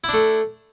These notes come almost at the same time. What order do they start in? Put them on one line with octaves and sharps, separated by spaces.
E4 D4 A3